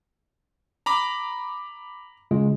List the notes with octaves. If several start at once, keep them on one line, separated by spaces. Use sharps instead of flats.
A#5 B5 D6
C#3 G#3 F4